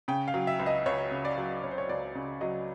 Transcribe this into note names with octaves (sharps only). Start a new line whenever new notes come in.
C#3 G5
F5
F#3
E5
C#2
D#5
C#2 C#5
C#3
D5
F#3
C#2 C#5
C5
C#5
C#2 D5
C#3
F#3 D#5